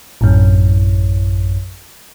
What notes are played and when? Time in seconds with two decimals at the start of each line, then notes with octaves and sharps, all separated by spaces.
0.21 A1 F#2